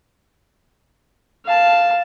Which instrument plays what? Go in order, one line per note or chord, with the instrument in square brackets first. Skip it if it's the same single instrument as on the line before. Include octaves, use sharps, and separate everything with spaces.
[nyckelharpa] F5 A5